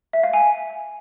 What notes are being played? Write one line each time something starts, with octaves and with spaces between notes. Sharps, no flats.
E5
F5
G#5